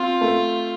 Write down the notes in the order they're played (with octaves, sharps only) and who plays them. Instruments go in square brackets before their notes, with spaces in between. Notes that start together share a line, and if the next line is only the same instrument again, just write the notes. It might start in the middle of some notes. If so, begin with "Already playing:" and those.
Already playing: [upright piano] C4 [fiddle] F4
[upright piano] A3